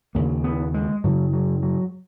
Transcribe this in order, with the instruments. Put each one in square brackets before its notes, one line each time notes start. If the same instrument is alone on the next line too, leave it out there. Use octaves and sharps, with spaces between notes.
[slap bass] D#2 C#3 A#3
B3
G#3
F#2 C#3 F#3
F#3
F#3